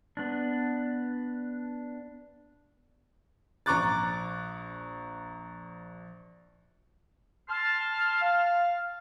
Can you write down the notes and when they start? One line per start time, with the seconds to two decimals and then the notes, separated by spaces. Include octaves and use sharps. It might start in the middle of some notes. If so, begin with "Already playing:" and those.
0.17 B3 D4
3.66 A#1 A#5 C#6 D6 F#6 A6
7.49 A5 C6 F6
8.22 F5